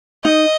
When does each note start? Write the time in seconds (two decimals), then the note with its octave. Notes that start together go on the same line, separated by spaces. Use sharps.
0.25 D#4 D#5